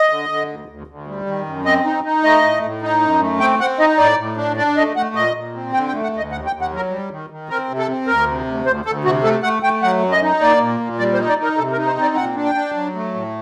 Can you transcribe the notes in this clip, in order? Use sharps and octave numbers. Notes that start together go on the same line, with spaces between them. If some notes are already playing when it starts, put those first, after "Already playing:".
Already playing: D#5
D3
D3
D2
D2
D2
G3
D#3
F#2
C4 D#5
D#4
D#4
A3 D#5
A2
A2
D#4
F#2
A3
C4 G5
C4 F#5
D#4 D#5
A2 D5
A2
D4
D4 D5
A3 D#5
A3 F#5
A#2 D#5
A#2
C4
D3 G5
G5
A3
F#5
D2 D#5
D#2 F#5
G5
D#2
F#5
F#3 A#4
G3
D#3
D#3
C4 A#4
C3
A4
C4
D2 A#4
C3
D2
D2 C5
D2 A4
C3 F#4
A3 A4
A3 F#5
A3 G5
F#3 F#5
F#2
D#5
D#4
A#3 D5
A#2
A#2
G3 D5
C5
D#4
D5
D#4 A#4
C3 A4
A#4
D#4
C5
C4
D5
A#2 F#5
D4
G5
D4
F#3
A3
A2